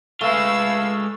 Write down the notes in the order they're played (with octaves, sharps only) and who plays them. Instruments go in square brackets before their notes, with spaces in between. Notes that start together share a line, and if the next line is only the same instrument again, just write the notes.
[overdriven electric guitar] G#3 F4 [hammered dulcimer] A3 [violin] B4 E6 [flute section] F5